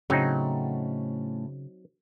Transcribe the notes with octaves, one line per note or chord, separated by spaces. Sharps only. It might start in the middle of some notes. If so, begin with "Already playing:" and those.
A2 C#3 F#3 A3 C4 C#4 D#4